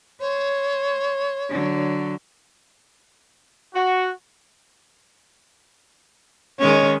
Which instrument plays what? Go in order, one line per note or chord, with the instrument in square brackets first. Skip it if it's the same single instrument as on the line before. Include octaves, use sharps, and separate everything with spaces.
[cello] C5 [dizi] C#5
[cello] D3 F#3
[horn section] F#4
[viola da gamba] D#3 G#3 C#4 [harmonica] C#5